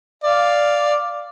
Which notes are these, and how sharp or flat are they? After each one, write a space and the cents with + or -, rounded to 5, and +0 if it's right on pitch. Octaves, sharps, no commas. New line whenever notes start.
D5 +0 F5 +0